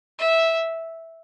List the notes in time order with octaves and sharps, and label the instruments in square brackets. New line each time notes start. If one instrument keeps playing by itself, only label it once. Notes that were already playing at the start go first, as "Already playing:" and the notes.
[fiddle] E5